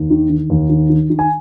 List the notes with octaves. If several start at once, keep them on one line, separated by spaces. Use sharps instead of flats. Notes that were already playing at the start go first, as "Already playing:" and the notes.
Already playing: D#2
D#3
D#3
D#2
D#3
D#3
D#3
G#5